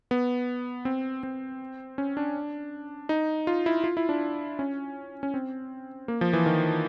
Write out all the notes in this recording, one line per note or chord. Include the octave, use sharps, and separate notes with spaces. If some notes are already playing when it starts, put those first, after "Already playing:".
B3
C4
C4
C#4
D4
D#4
F4
E4
F4
E4
D4
C#4
C#4
C4
A#3
F3
E3
D#3